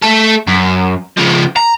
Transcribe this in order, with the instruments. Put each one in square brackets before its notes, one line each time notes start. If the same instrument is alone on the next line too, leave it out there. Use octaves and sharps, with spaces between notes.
[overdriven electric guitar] A3 A4
F#2
C#3 F3
A#5